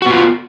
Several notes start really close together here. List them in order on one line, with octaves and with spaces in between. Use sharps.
F#4 B3 F4